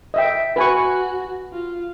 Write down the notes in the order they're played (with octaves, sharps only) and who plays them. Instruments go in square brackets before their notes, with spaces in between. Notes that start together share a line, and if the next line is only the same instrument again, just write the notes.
[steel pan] D#5 E5 G5
[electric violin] F#4 [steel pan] B4 G#5 C#6
[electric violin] F4